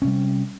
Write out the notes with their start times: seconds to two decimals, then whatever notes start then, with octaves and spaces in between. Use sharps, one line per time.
0.02 C#4
0.04 C3
0.07 G3